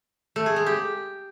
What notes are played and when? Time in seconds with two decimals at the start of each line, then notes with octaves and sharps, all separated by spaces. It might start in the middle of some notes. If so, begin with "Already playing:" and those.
0.36 A3
0.46 G#4
0.56 G#3
0.66 G4